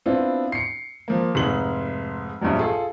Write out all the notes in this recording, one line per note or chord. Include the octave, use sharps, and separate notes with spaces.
B3 C4 D4 E4 F4
C7 C#7
F3 A#3
F1 G#2 G#3 F#7
A#1 E2 G2 F#3
F4 G#4 A4